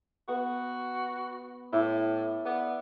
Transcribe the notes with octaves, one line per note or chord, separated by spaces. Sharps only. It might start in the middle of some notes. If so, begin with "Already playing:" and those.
B3 F#4
A2 E4 D6
B3 D5